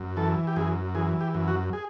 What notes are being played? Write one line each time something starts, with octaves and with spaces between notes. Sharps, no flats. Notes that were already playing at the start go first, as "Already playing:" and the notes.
Already playing: F#2
E3 A4
G4
F#2 G#4
E3 G#4
G4
F#2
F#4
G#4